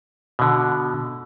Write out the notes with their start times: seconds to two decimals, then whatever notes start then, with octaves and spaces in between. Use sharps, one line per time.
0.39 B2 D3